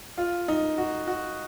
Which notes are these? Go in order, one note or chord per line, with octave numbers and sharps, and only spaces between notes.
F4
D#4
F#4
F#4